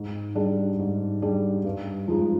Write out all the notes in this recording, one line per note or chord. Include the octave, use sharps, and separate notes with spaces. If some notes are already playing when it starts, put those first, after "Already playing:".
Already playing: G#2
G3 D4 G#4
G#2
G3 D4 G#4
G2
F3 G#3 D#4